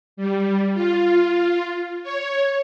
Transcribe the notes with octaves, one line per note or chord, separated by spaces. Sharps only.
G3
F4
C#5